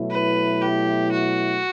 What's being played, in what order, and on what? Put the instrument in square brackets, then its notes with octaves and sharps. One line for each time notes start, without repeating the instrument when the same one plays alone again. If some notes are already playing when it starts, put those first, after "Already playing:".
Already playing: [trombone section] B2 F#3 A3 E4
[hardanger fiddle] B4
G4
F#4